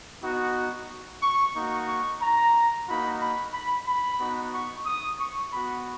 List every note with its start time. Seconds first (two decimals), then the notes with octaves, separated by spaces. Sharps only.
0.23 B3 D#4 F#4
1.22 C#6
1.55 A#3 D#4 F#4 C#6
1.88 C#6
2.21 A#5
2.87 A#3 D#4 F#4 B5
3.20 B5
3.54 B5
3.87 B5
4.20 B3 D#4 F#4
4.53 C#6
4.86 D#6
5.19 C#6
5.52 B3 F#4 B5